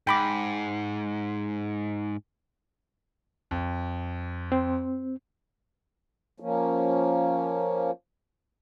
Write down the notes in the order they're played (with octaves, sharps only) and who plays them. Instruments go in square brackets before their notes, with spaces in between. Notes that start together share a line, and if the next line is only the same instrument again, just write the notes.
[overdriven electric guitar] G#2 [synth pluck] G5 B5 D6
[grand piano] F2
[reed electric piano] C4
[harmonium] F3 A#3 C#4